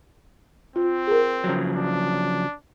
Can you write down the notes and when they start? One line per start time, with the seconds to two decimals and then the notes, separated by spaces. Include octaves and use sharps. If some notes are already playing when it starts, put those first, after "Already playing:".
0.76 C4 F4
1.07 G#4 A#4
1.44 C#3 F3 F#3
1.76 D4